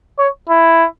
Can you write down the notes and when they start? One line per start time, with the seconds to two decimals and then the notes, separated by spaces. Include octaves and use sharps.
0.19 C#5
0.50 E4